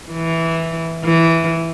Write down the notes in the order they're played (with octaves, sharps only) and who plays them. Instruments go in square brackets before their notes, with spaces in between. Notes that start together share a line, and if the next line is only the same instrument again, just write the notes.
[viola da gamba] E3
E3